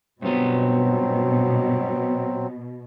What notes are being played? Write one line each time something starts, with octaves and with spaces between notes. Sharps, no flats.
G2 B2 F#3 B3 C4